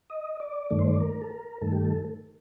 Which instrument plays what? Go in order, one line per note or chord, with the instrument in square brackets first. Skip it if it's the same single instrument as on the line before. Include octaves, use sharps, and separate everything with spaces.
[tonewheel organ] D#5
D5
G2 D#3 A3 D5
C5
D5
A#4
A4
A#4
G2 D#3 A3 A4
G4
A4